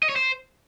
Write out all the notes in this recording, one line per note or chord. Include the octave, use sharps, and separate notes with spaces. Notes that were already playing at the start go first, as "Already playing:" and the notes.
D#5
C#5
C5